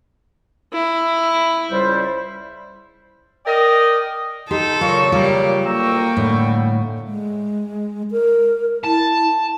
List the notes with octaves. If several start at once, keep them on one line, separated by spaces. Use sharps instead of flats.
E4
C#2 G3 C5
A#4 D5 D#5 G5
D#4 G4 A4 C6
A#2 C#3 F#3 F4 A#4 C#6
G3 A#3 F4 D5
D2 A#3 G5 A#5 C#6 E6
A2 D3 G3
G#3
A#4
E4 A5